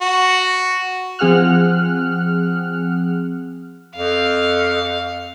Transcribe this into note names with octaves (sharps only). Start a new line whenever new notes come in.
F#4
F3 C4 G#4 F#5 F6 F#6
F2 F5